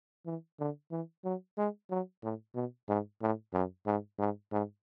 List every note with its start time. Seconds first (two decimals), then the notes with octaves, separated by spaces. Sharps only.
0.26 E3
0.60 D3
0.91 E3
1.25 F#3
1.58 G#3
1.90 F#3
2.23 A2
2.55 B2
2.89 G#2
3.22 A2
3.54 F#2
3.86 G#2
4.19 G#2
4.52 G#2